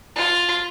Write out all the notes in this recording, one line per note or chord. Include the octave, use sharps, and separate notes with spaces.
F4